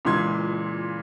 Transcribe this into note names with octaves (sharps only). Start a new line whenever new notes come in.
C#2 A#2 E3 C6 G#6